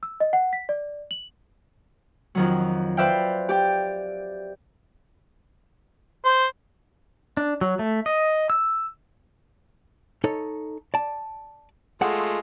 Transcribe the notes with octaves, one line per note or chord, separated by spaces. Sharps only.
E6
D#5
F#5
B6
D5
F#7
F2 D#3 F#3
B4 C5 D5 E5 F5 G5
G4 D5 G5
C5
D4
F#3
A3
D#5
E6
D#4 A4 C#5
D5 A5
G#3 A3 F4 F#5